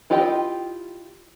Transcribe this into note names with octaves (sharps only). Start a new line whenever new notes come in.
E4 F4 G4 D#5 G5